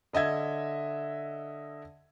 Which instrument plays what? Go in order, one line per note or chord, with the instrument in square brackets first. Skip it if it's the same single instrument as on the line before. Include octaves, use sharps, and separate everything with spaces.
[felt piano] D3 D#5 E5 G#6